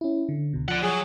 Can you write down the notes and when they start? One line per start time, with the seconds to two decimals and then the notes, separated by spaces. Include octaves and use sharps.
0.01 C#4 E4
0.29 D3
0.53 C#2 B2
0.68 F3 D5 F#5
0.83 F#3 G#4